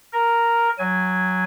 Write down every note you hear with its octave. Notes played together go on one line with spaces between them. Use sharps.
A#4
F#3 G#5